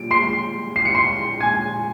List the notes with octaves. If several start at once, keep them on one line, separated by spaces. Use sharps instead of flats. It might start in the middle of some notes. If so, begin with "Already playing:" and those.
Already playing: A#2 G3 D7
C6 C7
C7
C#7
C6 C7
G#5 G#6